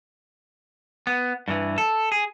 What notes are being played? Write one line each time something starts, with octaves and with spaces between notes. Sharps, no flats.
B3
G2 E3
A4
G#4